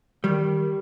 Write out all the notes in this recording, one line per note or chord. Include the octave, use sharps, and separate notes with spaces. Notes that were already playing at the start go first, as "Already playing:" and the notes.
D#3 G3